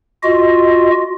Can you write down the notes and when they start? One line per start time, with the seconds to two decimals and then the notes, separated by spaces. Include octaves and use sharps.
0.23 F4 F#4 D#5